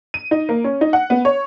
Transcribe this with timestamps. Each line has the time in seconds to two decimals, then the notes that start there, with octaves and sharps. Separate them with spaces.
0.14 D#7
0.31 D#4
0.49 A#3
0.64 C#4
0.81 D#4
0.93 F#5
1.10 B3
1.25 C#5